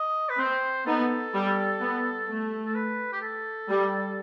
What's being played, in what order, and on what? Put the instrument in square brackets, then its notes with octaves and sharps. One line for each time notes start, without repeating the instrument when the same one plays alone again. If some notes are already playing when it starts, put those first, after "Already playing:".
Already playing: [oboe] D#5
B4
[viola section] C4 [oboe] C5
[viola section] B3 D#4 [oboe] A4
[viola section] G3
B3
A3
[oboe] A4
B4
G4
A4
[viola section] G3